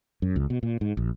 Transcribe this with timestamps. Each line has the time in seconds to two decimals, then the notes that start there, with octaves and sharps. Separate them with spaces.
0.22 F#2
0.36 C#2
0.50 B2
0.63 A#2
0.81 G#2
0.97 A#1